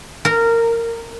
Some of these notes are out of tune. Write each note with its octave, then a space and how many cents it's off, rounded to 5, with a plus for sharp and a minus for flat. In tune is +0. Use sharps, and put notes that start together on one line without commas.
A#4 -15